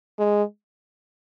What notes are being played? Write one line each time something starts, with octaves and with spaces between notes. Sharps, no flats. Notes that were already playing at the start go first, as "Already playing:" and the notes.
G#3